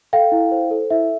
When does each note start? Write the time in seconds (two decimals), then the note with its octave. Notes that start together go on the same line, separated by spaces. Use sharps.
0.13 A4 F5 G5
0.32 E4
0.52 C5
0.71 A4
0.90 E4 E5